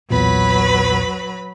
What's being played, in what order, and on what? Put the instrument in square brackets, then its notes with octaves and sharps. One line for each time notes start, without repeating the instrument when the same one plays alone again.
[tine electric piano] B1 E2 A#2 [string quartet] F#3 B4 B5